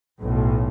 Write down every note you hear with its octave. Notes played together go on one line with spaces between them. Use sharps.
B1 A2